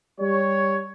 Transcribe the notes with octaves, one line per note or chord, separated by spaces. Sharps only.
G3 C#5